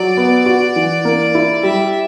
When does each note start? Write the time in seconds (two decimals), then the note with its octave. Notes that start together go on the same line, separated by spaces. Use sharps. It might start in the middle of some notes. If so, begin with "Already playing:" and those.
Already playing: F#3 D5
0.17 B3
0.46 F#4
0.76 E3
1.05 A#3
1.35 E4
1.63 G3 E5